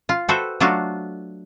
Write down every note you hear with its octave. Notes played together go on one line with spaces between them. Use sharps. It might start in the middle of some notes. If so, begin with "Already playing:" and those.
F4
F#4 A4 B4 C5 E5 G5
F#3 A3 D4 F4 F#4